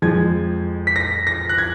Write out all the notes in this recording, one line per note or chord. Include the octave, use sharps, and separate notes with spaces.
F2 F3 G#3 G#6
B6
A#6
A#6
F#6
G#6